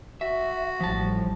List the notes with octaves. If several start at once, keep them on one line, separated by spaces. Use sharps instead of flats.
F#4 E5
A1 A2 F3 G3 A5